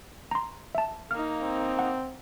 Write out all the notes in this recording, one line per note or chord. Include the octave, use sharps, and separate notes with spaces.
A#5 C6
E5 A5
A#3 D#4 F5 F6
C4
F#5